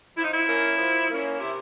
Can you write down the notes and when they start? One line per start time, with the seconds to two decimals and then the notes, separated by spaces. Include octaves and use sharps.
0.17 F3 E4
0.24 D#4
0.31 E4
0.47 A#3 C#4
0.78 F3
1.09 A#3 C#4
1.39 C3 E4